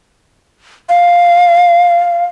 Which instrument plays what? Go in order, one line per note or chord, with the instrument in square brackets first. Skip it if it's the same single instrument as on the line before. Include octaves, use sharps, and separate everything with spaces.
[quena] F5